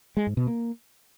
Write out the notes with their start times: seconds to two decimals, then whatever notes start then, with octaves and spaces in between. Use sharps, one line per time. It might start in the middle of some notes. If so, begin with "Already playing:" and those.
0.17 G#3
0.27 G#2
0.37 B2
0.47 A#3